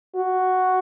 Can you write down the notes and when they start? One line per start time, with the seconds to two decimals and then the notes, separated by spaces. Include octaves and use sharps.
0.15 F#4